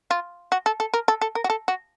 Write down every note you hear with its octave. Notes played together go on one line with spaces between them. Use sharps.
F4
F#4
A4
A4
A#4
A4
A4
A#4
F#4
A4
F#4